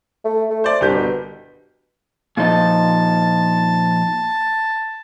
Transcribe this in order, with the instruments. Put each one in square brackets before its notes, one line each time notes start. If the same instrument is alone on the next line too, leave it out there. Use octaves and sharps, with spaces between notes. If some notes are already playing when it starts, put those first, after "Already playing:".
[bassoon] A3
A3
[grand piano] C5 D5
[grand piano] G1 G4 G6 [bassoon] C2
[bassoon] B2
[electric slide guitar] A#2 F3 D#4 [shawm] A5